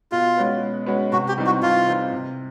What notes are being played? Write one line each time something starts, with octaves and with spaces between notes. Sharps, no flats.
B2 F4
G#3 C#4 F#4 B4
B2
G#3 C#4 F#4 B4
C3 F#4
G4
E3 G3 C4 D#4
F#4
C3 F4
E3 G3 C4 D#4
C3